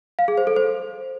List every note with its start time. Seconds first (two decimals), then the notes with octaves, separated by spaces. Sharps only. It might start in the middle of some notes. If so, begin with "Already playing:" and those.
0.19 F5
0.28 G#4
0.38 C5
0.47 A4
0.56 C5